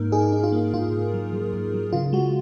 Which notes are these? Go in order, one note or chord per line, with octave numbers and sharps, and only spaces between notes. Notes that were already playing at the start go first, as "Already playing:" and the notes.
Already playing: G#2 A#3 D#4 A#4
D#4 G#4
D#4
F4
A#3
G#2 F4
G#2
F#3
F#3
G#2
F#3
C#3 F4
G#3 F#4